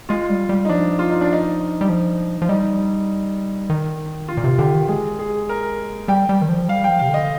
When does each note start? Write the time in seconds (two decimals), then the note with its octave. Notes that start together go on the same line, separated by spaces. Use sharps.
0.09 G#3 F4
0.29 G3
0.49 G3
0.65 D#4
0.69 F3 D4
0.99 F4
1.10 D#4
1.21 D4
1.33 D#4
1.81 G3
1.89 F3
2.42 F3
2.49 G3 D#4
3.70 D#3
4.28 F4
4.37 A#2
4.44 C3
4.58 D3 G4
4.74 D#3
4.89 G#3 G#4
5.19 G#4
5.49 A#4
6.08 G3 G5
6.29 G3
6.42 D#3
6.49 F3
6.68 G3 F5
6.84 F3 G5
6.99 C3 F5
7.09 D3
7.14 D#5